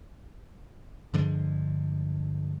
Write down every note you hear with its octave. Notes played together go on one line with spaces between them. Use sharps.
G2 D3 F3 G#3